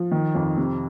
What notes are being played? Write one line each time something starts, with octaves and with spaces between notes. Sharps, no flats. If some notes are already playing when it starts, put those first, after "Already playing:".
Already playing: F3
D#3
F2
C3